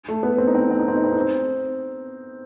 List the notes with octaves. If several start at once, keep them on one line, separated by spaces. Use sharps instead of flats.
A3
B3
C4
D#4
C4
D#4
C4
D#4
C4
D#4
C4
D#4
C4